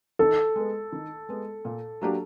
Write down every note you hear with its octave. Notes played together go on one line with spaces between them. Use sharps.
D#3 A4
G#3 B3
D#3
G#3 B3
A#2
F#3 A#3 D4 G4